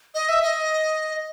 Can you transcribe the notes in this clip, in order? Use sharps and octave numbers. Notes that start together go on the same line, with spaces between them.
D#5
E5
D#5